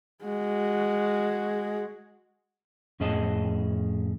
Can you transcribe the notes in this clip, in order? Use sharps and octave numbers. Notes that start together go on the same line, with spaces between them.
G#3 F#4
F2 A2 C#4 G#4 D#5 A5